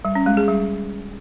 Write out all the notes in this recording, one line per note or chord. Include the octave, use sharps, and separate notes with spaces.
G3
C#4
G#3
G#4
G3